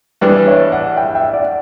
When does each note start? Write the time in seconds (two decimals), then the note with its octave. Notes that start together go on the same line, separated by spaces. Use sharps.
0.21 G2 E3 G3 B3 D4 B4 D5
0.46 C#5 E5
0.72 D5 F#5
0.96 E5 G5
1.15 E5 G5
1.33 D5 F#5